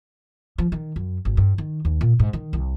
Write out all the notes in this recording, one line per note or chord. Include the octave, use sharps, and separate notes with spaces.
F3
D#3
F#2
G#1
G2
D#3
D#2
A#2
G#2
D#3
C2